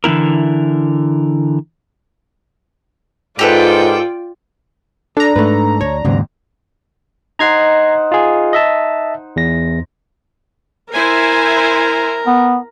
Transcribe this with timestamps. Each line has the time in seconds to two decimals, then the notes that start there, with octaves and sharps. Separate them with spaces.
0.04 D3 E3 C4 E4 A#4
3.39 G#2 F4 G4 A4 B4 D5 G5
5.17 D4 A4 A#5
5.36 G#2 A3 B4
5.81 D2 C#5
6.05 D#2 G#2 C#3 F#3 C4
7.39 D#4 C5 F#5 A#5 G#6 C7
8.12 F4 G#4
8.53 D#5 E5 A5
9.36 E2 A#6
10.93 E4 A#4 C5 G#5
12.27 B3